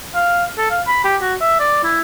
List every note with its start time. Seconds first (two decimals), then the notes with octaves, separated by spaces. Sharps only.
0.15 F5
0.58 A4
0.71 F5
0.87 B5
1.04 G4
1.21 F#4
1.40 E5
1.60 D5
1.84 E4